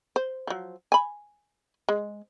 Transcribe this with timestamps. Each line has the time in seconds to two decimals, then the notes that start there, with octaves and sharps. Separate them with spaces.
0.16 C5
0.47 F3 F#3
0.92 G#5 B5
1.89 G#3